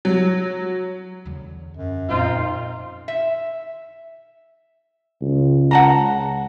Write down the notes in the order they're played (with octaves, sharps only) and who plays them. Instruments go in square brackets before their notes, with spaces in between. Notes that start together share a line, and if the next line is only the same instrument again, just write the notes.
[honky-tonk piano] F#3
[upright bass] E2 D3
[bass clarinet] F#2
[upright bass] F2 A#2 [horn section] C4 D#4 F4
[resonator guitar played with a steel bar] E5
[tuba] C#2
[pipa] F#5 A5 A#5